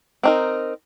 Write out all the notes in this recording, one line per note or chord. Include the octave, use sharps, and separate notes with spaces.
C4 D#4 A#4